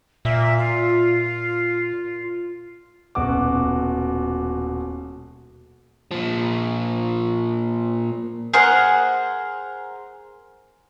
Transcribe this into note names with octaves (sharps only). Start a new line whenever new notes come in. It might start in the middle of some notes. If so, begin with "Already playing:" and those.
A#2 E5
F4
D#1 B2 F#4 D6
A#2 F3
G#4 A#4 C5 F#5